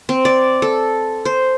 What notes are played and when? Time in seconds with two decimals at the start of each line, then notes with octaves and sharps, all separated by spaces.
0.09 C4
0.25 D5
0.62 A4
1.25 C5